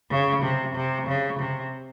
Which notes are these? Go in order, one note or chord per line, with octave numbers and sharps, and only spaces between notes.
C#3
C3
C3
C#3
C3